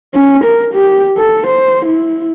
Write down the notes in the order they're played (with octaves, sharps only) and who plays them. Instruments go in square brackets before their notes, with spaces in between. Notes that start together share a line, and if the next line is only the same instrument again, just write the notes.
[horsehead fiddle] C#4
A#4
G4
A4
C5
E4